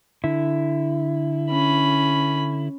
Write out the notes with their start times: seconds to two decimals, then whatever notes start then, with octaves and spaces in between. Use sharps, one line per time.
0.24 D3 E4
1.50 C#4 B5